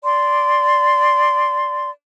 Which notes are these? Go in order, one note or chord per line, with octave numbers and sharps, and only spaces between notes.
D5 C6